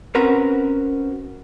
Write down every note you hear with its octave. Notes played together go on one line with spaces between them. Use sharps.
C4 C#4 F#4 A#4 B4